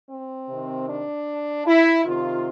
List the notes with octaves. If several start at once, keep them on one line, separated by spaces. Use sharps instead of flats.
C4
C3 D#3
D4
E4
C3 D#3 F4